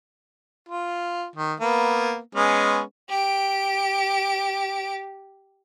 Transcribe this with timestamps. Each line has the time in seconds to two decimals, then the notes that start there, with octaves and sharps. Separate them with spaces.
0.69 F4
1.36 D#3
1.60 A#3 B3
2.35 G#3 B3 C#4
3.09 G4 D7